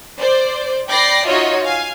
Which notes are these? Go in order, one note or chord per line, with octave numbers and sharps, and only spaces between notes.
C5 D5
D5 G5 B5 D6 A#6 C7
D#4 F4 F#4 C#5 D#5 E5
F5 G#5